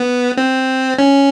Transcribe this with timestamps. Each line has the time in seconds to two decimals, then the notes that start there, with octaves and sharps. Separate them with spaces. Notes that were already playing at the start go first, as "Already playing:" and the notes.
Already playing: B3
0.37 C4
0.99 C#4